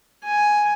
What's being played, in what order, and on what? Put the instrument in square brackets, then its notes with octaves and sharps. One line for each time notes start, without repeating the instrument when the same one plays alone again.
[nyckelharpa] G#5